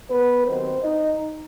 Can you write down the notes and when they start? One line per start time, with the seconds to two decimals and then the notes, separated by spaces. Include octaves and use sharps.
0.10 B3 B4
0.46 D#2 D#3 F#3 C4 C5
0.82 D#4 D#5